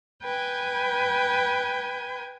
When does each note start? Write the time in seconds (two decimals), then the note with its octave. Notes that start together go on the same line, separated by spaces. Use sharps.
0.23 B4 G5 G#5 G6